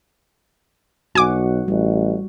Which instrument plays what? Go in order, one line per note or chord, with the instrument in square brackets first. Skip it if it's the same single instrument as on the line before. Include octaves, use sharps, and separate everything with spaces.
[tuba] B1 [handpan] F#4 F#5 [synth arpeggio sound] G#5 D6
[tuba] A1 [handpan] G3